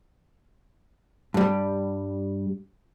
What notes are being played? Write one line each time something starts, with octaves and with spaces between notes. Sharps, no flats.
G2 G3